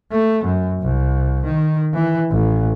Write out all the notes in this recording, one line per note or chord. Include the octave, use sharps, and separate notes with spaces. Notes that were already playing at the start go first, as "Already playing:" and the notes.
A3
F#2
C2
D#3
E3
A1